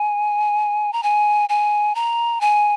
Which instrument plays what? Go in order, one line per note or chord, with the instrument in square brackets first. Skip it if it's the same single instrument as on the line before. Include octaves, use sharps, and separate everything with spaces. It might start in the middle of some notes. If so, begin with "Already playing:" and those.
Already playing: [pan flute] G#5
A#5
G#5
G#5
A#5
G#5